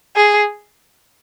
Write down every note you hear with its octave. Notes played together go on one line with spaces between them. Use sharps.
G#4